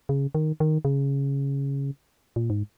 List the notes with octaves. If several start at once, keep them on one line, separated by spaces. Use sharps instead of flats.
C#3
D#3
D#3
C#3
A#2
G#2